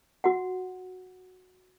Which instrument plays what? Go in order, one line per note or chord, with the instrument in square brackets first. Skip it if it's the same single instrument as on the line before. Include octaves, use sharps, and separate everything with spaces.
[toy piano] F#4 F#5